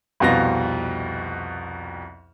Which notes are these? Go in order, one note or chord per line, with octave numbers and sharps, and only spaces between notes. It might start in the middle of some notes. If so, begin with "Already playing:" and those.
C2 F2 B2 F5 A#6